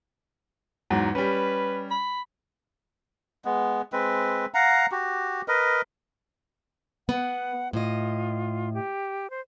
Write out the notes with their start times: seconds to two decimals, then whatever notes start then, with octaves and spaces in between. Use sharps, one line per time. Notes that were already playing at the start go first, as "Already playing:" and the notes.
0.90 E2 G#2 F#3
1.15 G3 C#4 B4
1.91 B5
3.45 G#3 B3
3.93 G#3 C4 B4
4.54 F5 F#5 A#5
4.92 F#4 G4
5.48 A#4 B4 D#5
7.09 B3 F#5
7.73 A2 F4 D#5
8.74 G4
9.30 C5